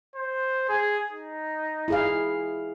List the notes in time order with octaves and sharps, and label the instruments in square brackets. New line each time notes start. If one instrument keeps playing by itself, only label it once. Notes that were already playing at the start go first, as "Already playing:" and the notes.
[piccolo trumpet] C5
G#4
D#4
[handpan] E4 G#4 F5